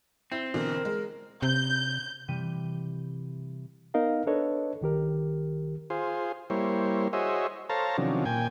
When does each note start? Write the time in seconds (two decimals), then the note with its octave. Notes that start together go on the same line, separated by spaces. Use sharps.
0.32 C4 E4
0.54 B2 D3 E3 A#4
0.85 G#3
1.42 C3 G6
2.28 C3 E3 G3 G4 B6 D#7
3.94 B3 D#4 A#4 D#5 F5
4.27 D4 A4 B4 C#5 D#5
4.81 C2 D#3 G4 A#4
5.90 F4 G#4 C5
6.50 G3 A#3 E4 C5 C#5
7.13 F#4 G#4 C5 C#5 D#5 E5
7.70 A4 C5 C#5 F5 A5 A#5
7.98 C3 D#3 F3 F#3 C#4 D4
8.25 A#2 G5 G#5